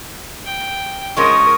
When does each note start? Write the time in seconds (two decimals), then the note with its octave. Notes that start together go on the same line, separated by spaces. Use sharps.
0.46 G5
1.17 F3 G#3 C#4 A#4 C#6 D#6